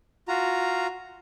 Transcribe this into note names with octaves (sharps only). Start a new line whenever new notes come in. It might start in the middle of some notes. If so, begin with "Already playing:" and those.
F4 F#4 A#5